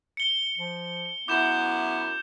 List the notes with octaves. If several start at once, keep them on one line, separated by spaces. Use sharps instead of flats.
C#7 G7
F3
F#2 B3 E4 D6 G6 E7